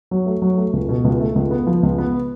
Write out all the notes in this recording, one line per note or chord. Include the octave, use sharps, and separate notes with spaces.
F#3
A3
F#3
A3
C#2
B2
C#2
A3
C#2
B3
F3
C#2
B3